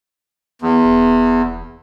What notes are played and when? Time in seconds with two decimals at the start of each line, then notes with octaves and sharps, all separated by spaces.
0.62 E2
0.84 E1